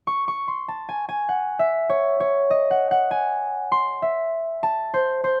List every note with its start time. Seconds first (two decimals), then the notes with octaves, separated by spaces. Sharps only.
0.07 C#6
0.28 C#6
0.48 C6
0.68 A5
0.89 G#5
1.09 G#5
1.29 F#5
1.59 E5
1.89 C#5
2.20 C#5
2.50 D#5
2.71 F#5
2.91 F#5
3.11 G#5
3.72 C6
4.02 E5
4.63 A5
4.94 C5
5.24 C5